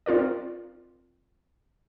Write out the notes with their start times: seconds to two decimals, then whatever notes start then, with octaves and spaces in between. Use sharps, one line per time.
0.06 C4 F4 A#4 D5